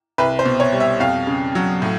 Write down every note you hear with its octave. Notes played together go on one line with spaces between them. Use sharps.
C2 B4
C5
B2
C#5
G3
E5
F2 F5
C#3
F#3
A2